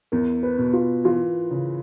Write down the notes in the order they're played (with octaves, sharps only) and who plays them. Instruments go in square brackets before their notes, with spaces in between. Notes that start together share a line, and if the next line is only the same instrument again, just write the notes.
[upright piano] E2 [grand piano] A#4
[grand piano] B4
[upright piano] B2
[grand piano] F4
[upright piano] E3 [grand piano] F4
[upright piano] C#3